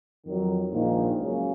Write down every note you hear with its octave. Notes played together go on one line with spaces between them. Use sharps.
F2 D#3 F#3
A#1 G#2 D#3 A#3 D#4
C#2 C#3 F#3 A#3